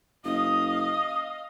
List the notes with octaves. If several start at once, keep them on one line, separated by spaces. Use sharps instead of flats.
F#1 D#5 F5 D#6